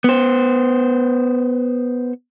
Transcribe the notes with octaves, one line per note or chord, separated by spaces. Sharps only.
B3 C5